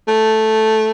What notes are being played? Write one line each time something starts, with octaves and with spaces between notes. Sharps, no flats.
A3